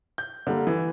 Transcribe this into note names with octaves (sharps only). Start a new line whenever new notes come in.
G6
D3 G3 A#3
E3